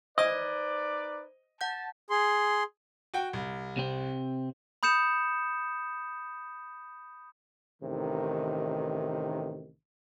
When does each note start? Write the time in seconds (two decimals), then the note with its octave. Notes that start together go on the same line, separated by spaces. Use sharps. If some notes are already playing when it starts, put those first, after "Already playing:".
0.18 D#4 B4 C5 D5 D#5 G#6
1.61 F#5 A5 G6
2.10 G#4 C6
3.14 F#4 G5
3.33 C2
3.77 C3 C4
4.83 B5 D#6 G6 C#7 E7
7.82 A1 C3 D#3